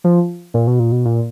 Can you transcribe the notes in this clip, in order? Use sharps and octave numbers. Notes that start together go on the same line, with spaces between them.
F3
A#2
B2
A#2
B2
A#2